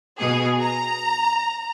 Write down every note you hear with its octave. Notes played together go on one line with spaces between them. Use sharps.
B2 G#4
A#5